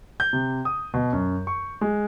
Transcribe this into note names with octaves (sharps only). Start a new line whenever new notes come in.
G6
C3
D#6
B2
F#2
C#6
G#3